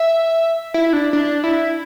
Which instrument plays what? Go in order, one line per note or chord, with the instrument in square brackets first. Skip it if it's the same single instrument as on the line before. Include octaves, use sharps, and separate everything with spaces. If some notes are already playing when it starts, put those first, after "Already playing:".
Already playing: [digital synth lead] E5
E4
D4
D4
E4